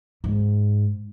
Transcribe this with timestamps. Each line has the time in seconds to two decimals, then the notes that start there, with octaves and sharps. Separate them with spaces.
0.24 G#2